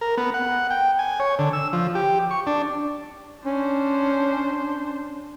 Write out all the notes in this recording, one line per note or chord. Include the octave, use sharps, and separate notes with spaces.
A#4
B3
F#5
G5
G#5
C#5
D3
E6
F3
G4
C#6
D4
C#4 D4 C5